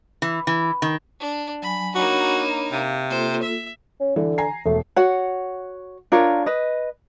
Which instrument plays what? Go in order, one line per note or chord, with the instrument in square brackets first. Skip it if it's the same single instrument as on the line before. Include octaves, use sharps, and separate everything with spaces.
[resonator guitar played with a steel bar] E3
E3
D#3
[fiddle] D4
[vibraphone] F#3 G#5 [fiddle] B5
[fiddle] A#3 D#4 [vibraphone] D4 C#5 B5 [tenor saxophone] F#4
[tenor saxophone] C3 [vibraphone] F5
[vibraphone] A#3 F4 A4 [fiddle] C5
[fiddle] E5
[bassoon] C#4
[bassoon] D3 [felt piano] E3
[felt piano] G#5 A#5 C7
[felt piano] E1 [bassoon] A3
[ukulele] F#4 C#5 F#5
D4 F4 A#4 C#5
B4 D#5